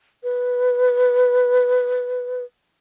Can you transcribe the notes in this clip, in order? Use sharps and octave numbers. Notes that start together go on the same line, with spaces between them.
B4